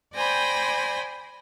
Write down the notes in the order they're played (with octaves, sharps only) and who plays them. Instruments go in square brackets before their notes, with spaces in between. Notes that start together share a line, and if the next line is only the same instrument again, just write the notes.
[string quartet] C5 D5 G5 G#5 B5 A#6